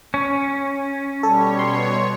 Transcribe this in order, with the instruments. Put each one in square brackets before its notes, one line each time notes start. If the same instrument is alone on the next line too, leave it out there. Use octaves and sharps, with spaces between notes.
[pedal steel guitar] C#4
[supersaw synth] B2 C#5 [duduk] G3 [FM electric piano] A4
[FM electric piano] C6